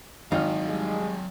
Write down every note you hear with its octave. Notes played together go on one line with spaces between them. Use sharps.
G#1 F#3 D#4 F5 F6
G3 G#3 G#4